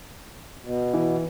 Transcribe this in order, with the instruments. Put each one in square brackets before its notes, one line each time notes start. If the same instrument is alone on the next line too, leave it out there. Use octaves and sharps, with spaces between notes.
[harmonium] B2
[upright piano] E3